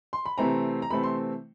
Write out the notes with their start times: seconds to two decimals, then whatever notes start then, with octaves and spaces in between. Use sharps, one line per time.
0.13 C6
0.26 B5
0.38 C3 E3 A3 C4 A#5
0.82 A#5
0.90 C3 E3 A3 C4 B5
1.03 C6